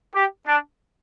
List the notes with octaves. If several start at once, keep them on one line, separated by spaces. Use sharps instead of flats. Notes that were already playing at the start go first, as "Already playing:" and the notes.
G4
D4